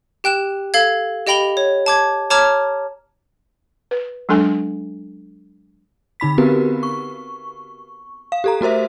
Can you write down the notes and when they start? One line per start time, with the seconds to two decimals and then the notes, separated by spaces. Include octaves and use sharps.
0.24 G4 G5 F#6 E7
0.74 A4 F5 G#6
1.27 G4 D#5 G5 B5 F7 G7
1.57 C#5
1.86 A5 D6 G#6
2.30 C#5 A5 A#5 D6 F6 G#6
3.91 B4
4.29 F#3 G#3 D4 A4 G#5
6.20 D3 D#4 B5 B6
6.38 B3 C4 F#4 G4 A#4 B4
6.83 C#6
8.32 F5
8.44 G4 A4 A#5
8.61 A3 F#4 A#4 C5 E5